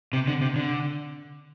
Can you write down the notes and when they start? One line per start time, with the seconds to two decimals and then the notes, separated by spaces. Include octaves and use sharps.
0.13 C3
0.27 D3
0.41 C3
0.56 D3